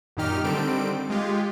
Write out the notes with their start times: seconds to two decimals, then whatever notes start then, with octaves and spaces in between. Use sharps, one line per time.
0.17 F#2 A#2 D#3 D#4 G4 F6
0.44 D3 D#3 G3 C4 A4 D7
1.10 G#3 F4 G4